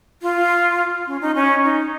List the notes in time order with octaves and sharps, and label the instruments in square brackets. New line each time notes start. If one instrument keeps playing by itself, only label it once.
[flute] F4
C#4
D#4
C#4
D#4